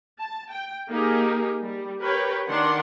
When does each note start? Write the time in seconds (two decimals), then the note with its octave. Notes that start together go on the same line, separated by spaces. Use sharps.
0.20 A5
0.52 G5
0.89 A#3 D#4 G4 G#4 A#4
1.63 G3
2.00 G4 A#4 B4 C#5 G5
2.49 D#3 D4 A#4 D5 F#5 C6